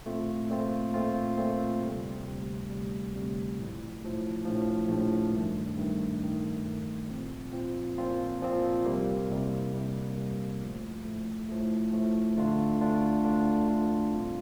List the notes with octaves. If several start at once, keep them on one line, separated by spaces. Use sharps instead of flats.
A#2 A3 C4 F4
A#2 A3 C4 F4
A#2 A3 C4 F4
A#2 A3 C4 F4
D2 C3 G3
D2 C3 G3
D2 C3 G3
D2 C3 G3
A#1 A2 F3
A#1 A2 F3
A#1 A2 F3
A#1 A2 F3
G2 D#3 A3
G2 D#3 A3
G2 D#3 A3
G2 D#3 A3
A#2 F3 C4 F4
A#2 F3 C4 F4
A#2 F3 C4 F4
A#2 F3 C4 F4
C2 C3 G3 A#3
C2 C3 G3 A#3
C2 C3 G3 A#3
C2 C3 G3 A#3
A2 F3 A3
A2 F3 A3
A2 F3 A3
A2 F3 A3
D2 D3 A3 D4 F4
D2 D3 A3 D4 F4
D2 D3 A3 D4 F4
D2 D3 A3 D4 F4
A#2 G3 C4 F4